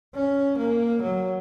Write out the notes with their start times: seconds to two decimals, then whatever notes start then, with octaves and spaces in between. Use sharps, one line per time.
0.14 C#4
0.58 A#3
1.02 F#3